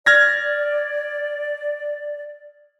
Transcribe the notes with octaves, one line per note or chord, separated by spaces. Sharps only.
D5 F6 G#6 A#6